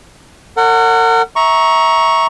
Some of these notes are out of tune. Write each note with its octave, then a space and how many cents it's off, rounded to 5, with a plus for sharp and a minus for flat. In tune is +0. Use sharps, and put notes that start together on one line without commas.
A#4 -40 C#5 +0 F#5 +0
E5 -20 A#5 +15 C#6 +0